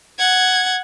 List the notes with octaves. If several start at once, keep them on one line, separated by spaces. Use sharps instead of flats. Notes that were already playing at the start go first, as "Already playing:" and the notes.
F#5 G#6